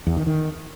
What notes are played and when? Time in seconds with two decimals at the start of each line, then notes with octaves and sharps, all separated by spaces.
0.07 E2
0.17 D#3
0.27 D#3